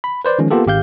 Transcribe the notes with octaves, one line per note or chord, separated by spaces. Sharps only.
B5
B4 C5 D5
D#3 F3 G#3 C#4
A#3 B3 F4 G4 A4
G#1 G4 F5 G6